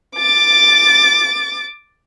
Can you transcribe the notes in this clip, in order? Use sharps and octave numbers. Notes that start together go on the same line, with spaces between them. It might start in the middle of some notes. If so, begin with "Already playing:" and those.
D6 A6